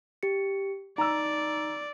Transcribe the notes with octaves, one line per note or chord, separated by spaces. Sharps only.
G4 C#7
D#4 D5 A#5 E6